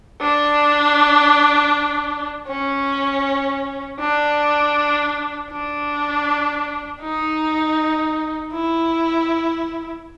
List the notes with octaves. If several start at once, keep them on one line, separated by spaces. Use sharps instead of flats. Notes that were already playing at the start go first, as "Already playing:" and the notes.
D4
C#4
D4
D4
D#4
E4